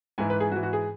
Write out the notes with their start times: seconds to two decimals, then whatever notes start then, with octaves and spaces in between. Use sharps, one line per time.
0.18 G#2 E3 G#5
0.30 B4
0.40 G#4
0.51 G#2 F#4
0.56 E3
0.63 F#4
0.73 G#4